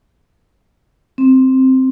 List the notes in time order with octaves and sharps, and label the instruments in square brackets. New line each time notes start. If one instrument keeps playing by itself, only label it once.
[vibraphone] C4